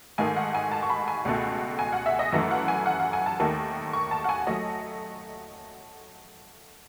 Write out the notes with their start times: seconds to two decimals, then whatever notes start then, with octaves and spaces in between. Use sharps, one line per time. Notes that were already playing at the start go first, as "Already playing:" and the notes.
0.18 G#2 D#3 A3 G#5
0.36 F#5
0.55 G#5
0.71 A5
0.83 C#6
0.90 B5
1.08 G#5
1.25 C#2 B2 A3
1.79 G#5
1.93 F#5
2.06 E5
2.19 D#5
2.32 F#2 E3 A3
2.51 F#5
2.68 G#5
2.86 F#5
3.00 F#5
3.13 G#5
3.26 A5
3.40 D#2 D#3 A3
3.93 C#6
4.11 A5
4.24 F#5
4.29 G#5
4.47 F#3 A3 D#5